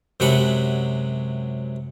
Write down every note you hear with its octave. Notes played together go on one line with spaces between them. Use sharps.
F#2 C3 F#3 G#3 F#5 B5